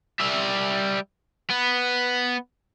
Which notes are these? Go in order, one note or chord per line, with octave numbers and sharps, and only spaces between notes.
G3 E5
B3